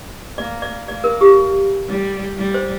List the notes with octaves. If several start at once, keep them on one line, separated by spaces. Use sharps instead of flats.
A#3 D5
D5
A#3 D5
A#4
G4
G3
G3
C5